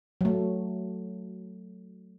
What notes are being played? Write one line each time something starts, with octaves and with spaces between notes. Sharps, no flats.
F#3 A3